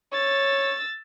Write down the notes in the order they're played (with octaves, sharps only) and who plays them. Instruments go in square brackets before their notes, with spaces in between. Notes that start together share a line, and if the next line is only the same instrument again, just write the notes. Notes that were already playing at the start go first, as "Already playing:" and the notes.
[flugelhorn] C#5 [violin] E6 A6